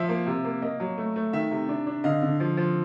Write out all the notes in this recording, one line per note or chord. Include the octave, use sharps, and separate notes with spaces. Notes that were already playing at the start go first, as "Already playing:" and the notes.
Already playing: F3 E5
A#3
C3
A#3
A#3 D#5
F#3
A3
A3
D#3 E5
C3
D4
D4
D3 D#5 F5
D3
F3
F3